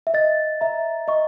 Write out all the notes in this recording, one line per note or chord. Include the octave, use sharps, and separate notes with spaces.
E5
D#5 A6
E5 A#5
D#5 C#6